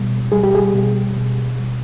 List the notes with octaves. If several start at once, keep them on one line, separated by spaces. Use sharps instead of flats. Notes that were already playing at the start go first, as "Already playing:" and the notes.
Already playing: B2 G3
G3 G#4
G4
G#4
B2
B2
G3